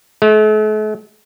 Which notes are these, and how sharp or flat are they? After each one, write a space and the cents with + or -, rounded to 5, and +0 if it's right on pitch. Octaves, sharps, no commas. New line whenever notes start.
A3 -45